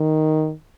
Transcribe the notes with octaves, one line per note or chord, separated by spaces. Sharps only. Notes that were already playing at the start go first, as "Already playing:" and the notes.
Already playing: D#3